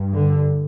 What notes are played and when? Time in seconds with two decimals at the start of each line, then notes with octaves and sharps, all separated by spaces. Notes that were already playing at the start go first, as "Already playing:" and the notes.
Already playing: G2
0.13 D3